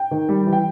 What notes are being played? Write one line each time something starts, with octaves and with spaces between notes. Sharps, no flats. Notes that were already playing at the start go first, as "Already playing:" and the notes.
Already playing: G5
D#3
G3
E3
G5